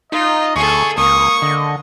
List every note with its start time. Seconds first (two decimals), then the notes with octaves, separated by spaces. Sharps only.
0.12 D#4 F4 D#5
0.56 D2 G#4 A4 C#6
0.98 C#2 A#3 C#6 D#6
1.42 D3 D#5